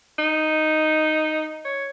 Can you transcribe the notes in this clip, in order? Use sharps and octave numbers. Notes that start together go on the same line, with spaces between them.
D#4
C#5